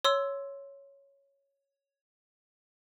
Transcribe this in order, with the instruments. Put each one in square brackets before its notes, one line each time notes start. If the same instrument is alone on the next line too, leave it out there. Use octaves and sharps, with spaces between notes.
[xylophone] C#5 C6 E6